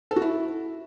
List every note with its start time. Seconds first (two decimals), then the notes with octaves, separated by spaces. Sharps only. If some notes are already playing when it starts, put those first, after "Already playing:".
0.11 A4
0.16 F#4
0.22 E4